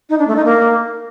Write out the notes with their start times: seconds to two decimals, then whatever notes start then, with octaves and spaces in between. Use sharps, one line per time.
0.10 D#4
0.19 D4
0.28 A3
0.36 D#4
0.45 A#3